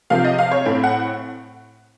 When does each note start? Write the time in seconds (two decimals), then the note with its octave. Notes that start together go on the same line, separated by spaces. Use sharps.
0.10 C3 F3 C4 F5
0.24 D#5
0.38 F5
0.51 C#5
0.65 A2 A3 C4
0.83 F#5